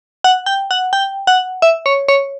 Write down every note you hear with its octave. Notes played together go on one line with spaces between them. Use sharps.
F#5
G5
F#5
G5
F#5
E5
C#5
C#5